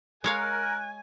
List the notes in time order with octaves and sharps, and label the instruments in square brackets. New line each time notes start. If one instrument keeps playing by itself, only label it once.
[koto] G#3 C#5 F5 [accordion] A#4 [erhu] G#5 [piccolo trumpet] F#6